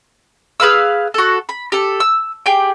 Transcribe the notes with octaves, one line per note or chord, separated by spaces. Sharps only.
G#4 B4 F5 E6
F#4 A4
B5
G4 A4
E6
G4 G#4 G5